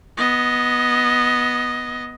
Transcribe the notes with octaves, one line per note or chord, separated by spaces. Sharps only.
B3 D#5